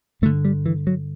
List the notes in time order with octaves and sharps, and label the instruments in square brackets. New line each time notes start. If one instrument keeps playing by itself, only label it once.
[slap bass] G2 A3
D3
G3
E3
F#3